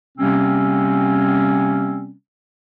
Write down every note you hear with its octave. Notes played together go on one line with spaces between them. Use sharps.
C3 G3 A#3 C4 C#4